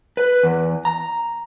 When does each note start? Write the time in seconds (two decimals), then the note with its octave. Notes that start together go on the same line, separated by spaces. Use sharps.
0.17 B4
0.43 E2
0.85 A#5